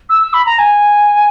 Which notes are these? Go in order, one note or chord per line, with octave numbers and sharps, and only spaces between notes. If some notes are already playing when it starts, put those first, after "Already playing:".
E6
E6
B5
A#5
G#5